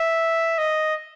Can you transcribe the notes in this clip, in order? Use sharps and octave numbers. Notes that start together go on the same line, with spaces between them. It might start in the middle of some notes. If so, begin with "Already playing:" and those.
Already playing: E5
D#5